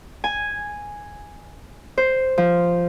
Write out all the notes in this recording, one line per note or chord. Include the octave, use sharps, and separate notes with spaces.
G#5
C5
F3